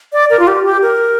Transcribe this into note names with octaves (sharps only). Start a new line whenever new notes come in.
D5
A#4
F4
G4
G4
A#4